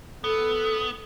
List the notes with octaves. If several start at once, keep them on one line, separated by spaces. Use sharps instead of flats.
B3 A4